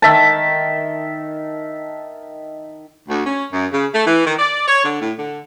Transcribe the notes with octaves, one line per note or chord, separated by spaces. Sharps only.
D#3 E5 A5
D2
C#4
F#2
C#3
A3
E3
D#3
D5
C#5
D3
A2
D3